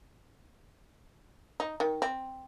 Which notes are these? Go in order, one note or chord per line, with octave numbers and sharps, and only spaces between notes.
D#4
D#3
C4